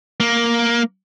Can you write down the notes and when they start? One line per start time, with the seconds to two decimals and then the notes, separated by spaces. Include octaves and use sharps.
0.20 A#3